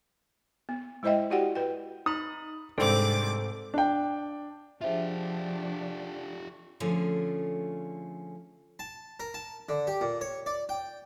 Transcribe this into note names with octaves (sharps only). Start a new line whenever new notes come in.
B3
G#3 E4 C5 D#5 E5 G5
E4 F#4 G4 D5 F#5 G5
B4 G5
D#4 B5 D#6
C2 G#2 C4 D4 A4 C5 D6 A6
D4 G5
F3 D4 F4 G4 G#4 C5 E5
D3 F3 A3 C#4 G#4
A5
A#4
A5
D3
G4
A#2
C#5
D5
G5